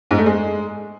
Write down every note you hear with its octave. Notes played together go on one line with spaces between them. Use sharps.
G#2
A3
G#3